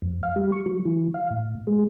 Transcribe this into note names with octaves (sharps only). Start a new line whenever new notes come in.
F2
F5
G3
C#6
F#3
E3
F5
A2
G#3